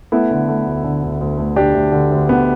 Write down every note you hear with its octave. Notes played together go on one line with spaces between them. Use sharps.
A3 B3 E4
D3
A3
D2
D3
D2
D2
A3
D2 D4 G4
D2
D3
D2
D3 B3